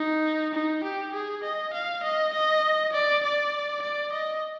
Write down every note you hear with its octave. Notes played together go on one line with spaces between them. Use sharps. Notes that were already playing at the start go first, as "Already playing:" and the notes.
Already playing: D#4
D#4
G4
G#4
D#5
F5
D#5
D#5
D5
D5
D5
D#5